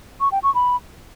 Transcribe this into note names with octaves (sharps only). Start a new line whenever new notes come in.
C#6
G5
C#6
B5